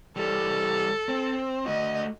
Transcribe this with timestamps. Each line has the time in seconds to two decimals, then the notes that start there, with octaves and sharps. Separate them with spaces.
0.16 E3 G3 A4
1.09 C4
1.66 A3 F#4 D#5